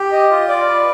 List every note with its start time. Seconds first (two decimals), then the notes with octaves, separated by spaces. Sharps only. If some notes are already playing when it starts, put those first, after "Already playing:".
Already playing: G4
0.12 D#5
0.31 F4
0.48 D5
0.67 B4